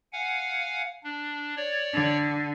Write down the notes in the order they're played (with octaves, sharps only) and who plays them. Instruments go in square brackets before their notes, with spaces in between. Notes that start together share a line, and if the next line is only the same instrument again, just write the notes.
[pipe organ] F5 F#5 G#5
D4
C#5 D5
[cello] D3